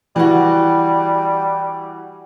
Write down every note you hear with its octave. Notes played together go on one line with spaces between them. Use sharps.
E3 G3 E4 F#4